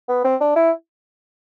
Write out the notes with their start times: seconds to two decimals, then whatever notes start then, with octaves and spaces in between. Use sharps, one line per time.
0.09 B3
0.24 C4
0.41 D4
0.56 E4